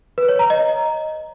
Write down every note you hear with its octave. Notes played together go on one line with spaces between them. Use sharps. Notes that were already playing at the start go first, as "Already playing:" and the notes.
B4
C#5
A#5
D#5